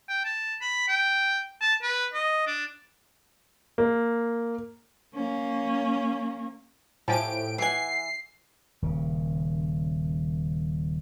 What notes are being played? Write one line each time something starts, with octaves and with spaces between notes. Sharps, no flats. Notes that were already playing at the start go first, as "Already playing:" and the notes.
G5
A5
B5
G5
A5
B4
D#5
D4
A#3
A#3 C#4
A2 F3 G4 C5 G#5 A5 D7
E3 G#4 F#5 G#5 C7
D#1 C#3